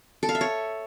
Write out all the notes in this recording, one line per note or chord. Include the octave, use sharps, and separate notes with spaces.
A4
F5
E5
C#5